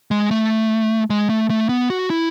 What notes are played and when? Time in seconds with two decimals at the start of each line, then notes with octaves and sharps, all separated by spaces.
0.11 G#3
0.31 A3
1.10 G#3
1.30 A3
1.50 A3
1.69 B3
1.90 F#4
2.10 E4